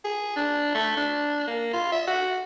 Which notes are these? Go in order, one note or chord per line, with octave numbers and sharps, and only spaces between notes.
G#4
D4
A3
D4
A#3
F4
E5
F#4